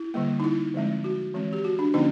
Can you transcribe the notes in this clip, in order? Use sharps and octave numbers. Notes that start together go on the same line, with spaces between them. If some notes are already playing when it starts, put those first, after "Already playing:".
Already playing: E4
D3 G3 A#3
D#4
E4
D3 F3 G#3 C4
F#4
E3 G#3 C4
G4
F#4
D4
D3 F3 A#3 C#4 D#4